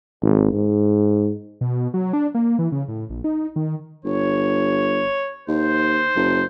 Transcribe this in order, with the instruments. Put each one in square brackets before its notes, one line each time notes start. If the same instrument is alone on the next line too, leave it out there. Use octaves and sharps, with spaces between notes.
[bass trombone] G#1
G#2
[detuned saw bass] B2
F#3
D4
A#3
E3
C#3
A2
A#1
D#4
D#3
[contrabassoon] G1 [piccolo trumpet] C#5
[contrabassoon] D#2 [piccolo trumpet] C5
[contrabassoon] F#1